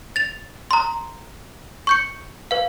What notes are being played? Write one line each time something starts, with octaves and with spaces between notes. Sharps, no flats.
A6 F7
A#5 C6
C#6 G6 C#7
B4 F5